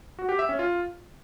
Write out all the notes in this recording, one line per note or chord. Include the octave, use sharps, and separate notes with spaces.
F#4
G4
E5
C#4
F4